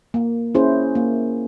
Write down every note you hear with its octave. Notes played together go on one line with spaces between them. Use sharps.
A#3
C#4 E4 G#4 C5
A#3